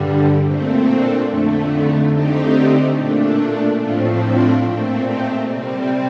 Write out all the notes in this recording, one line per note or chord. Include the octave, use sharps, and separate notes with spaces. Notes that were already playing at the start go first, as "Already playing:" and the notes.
Already playing: G2 D3 G3
A#2 A3 C4
D4
F2 D3 A3
D#4
D3 A3 C4 D#4 G4
A#2 A3 D4
A2 F3 A3 C4 D4 F4
D4 F4
A#2 A3 C4
D#4 G4
C3 G3 C4